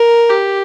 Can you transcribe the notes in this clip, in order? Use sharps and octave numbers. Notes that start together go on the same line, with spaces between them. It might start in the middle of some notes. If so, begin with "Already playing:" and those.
Already playing: A#4
G4